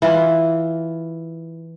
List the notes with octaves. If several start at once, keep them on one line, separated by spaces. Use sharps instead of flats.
E3 E4 F4